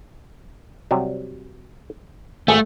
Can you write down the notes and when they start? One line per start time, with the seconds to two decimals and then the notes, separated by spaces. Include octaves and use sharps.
0.91 C3 F#3 G3
2.48 G#1 A3 G#4